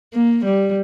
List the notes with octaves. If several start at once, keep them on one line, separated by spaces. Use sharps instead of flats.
A#3
G3